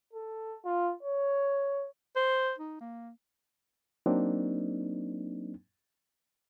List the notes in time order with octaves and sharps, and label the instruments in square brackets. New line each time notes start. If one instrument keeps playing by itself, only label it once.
[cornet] A4
F4
C#5
[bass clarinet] C5
D#4
A#3
[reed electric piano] F#3 A#3 C4 D4 D#4